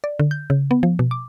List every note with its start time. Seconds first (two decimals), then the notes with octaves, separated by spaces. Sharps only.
0.04 D5
0.19 D3
0.31 G6
0.50 C#3
0.71 B3
0.83 F3
0.99 B2
1.11 D6